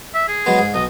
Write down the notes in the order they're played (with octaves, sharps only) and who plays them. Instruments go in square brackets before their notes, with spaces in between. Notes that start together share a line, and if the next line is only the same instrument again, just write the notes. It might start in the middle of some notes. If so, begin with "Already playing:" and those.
[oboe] E5
G#4
[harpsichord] F#3 G#3 B3
G#2
[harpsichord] B1 [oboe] D#5